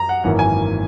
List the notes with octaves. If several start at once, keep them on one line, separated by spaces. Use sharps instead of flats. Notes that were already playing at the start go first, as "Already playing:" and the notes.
Already playing: F#2 A#5
F#5
G#1 F#2 E3 A#3 F#5
G#5